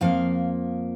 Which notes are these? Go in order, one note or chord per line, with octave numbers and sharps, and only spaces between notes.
F2 F3 A#3 F5